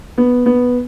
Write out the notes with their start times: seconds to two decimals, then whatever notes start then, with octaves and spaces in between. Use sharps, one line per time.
0.18 B3
0.46 B3